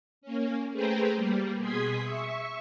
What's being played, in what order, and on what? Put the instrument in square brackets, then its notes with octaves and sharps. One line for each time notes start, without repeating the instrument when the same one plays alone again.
[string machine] A#3 C#4
A3 G#4 B4 C5 G5 A#5
G3 A#3
B2 G#4 C6 D#6 G#6 B6
E5 C#6